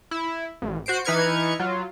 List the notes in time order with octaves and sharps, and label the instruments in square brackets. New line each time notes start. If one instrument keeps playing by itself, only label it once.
[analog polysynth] E4
A1
F#4 C5 C7 D7
E3 D#4 B4 F6 G#6 C#7
F#3 F4